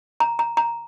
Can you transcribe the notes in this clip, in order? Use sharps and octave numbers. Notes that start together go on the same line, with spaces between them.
A#5
A#5
A#5